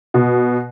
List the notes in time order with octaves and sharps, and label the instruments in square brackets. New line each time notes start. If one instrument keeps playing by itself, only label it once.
[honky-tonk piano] B2